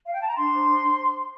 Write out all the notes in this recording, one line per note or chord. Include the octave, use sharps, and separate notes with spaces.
F5
G5
A5
A#5
D4 C6
C5